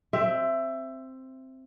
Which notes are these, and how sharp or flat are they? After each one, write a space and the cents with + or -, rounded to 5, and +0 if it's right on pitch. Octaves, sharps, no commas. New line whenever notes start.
C4 +0 E5 +15